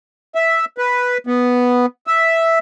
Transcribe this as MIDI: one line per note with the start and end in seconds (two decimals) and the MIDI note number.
0.35 0.65 76
0.78 1.18 71
1.27 1.86 59
2.07 2.59 76